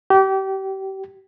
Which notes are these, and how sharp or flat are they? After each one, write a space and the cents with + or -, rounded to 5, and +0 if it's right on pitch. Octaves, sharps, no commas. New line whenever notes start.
G4 -30